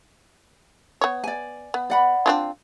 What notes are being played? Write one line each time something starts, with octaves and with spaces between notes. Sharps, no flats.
B3 C#5
D5 G#5
B3
D5 F#5 B5
C4 D4 F4